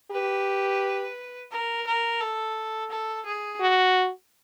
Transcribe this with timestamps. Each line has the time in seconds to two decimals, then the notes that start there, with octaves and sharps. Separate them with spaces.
0.11 G4 B4
1.51 A#4
1.86 A#4
2.21 A4
2.90 A4
3.25 G#4
3.61 F#4